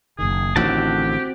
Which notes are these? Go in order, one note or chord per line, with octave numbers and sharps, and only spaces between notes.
F#1 B1 D#3 G#4
A1 A2 D3 D#3 C4 F#4 G4 A5